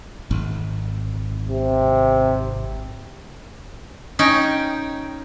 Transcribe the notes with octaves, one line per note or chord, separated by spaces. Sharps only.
G#1
C3
C#4 D#4 G5